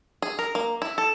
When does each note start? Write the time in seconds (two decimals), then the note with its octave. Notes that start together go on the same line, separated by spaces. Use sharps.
0.22 G#4
0.39 A#4
0.55 A#3
0.82 E4
0.98 A4